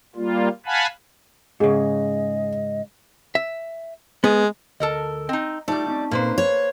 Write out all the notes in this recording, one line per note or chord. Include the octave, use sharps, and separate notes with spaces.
G3 A#3 F4
F5 F#5 G#5 A5 B5
G#2 C#3 G#4 D#5
E5
G#3 B3
D2 A4 A#4 D#5
C4 D#4 D#5
G3 A3 D#4 F4 D5
C4 C#4 D#4
A#2 A#3 B4 C5
C#5